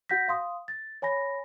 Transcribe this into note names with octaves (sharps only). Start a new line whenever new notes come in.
F#4 F#5 G6 A#6 B6
F5 C6 D#6
A6
C#5 G#5 B5 A#6